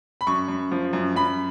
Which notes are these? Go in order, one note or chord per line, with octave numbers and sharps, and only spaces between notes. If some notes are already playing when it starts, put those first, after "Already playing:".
B5
F#2 C#6
F#2
F3
F#2
F#2 B5